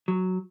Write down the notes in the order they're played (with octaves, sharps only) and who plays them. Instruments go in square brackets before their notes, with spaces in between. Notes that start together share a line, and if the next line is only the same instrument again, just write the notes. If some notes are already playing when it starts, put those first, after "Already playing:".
[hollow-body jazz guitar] F#3